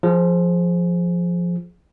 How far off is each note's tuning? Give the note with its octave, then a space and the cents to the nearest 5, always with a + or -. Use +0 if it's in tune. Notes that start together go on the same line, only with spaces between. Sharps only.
F3 +0 G#4 +10